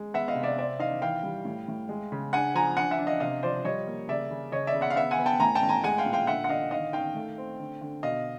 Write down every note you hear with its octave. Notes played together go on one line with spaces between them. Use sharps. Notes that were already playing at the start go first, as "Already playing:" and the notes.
Already playing: G#3
B3 E5 F#5
D#5 F5
C3
D5 E5
C4 D5 E5
D#3 D#5 F5
E3 F5 G5
G3
A2
A2
G#3
C#3
D4 F#5 G#5
F3 G#5 A#5
D4 F#5 G#5
E5 F#5
D4
D#5 F5
C3 D#5 F5
F3 C5 D5
G3 C#5 D#5
A#3
C#3 D5 E5
C#3
C#3 C#5 D#5
D5 E5
C#3
E5 F#5
F5
B3 E5 F#5
F#5 G#5
B3
G5 A5
A2 G#5 A#5
G5 A5
A2
G#5 A#5
G#3 F#5 G#5
F5 G5
A#2
F5 G5
D3 E5 F#5
F#5
D3 D#5 F5
D#3 D#5 F5
D#3 F5 G5
A3
C4
D3
D3
B2 D#5 F5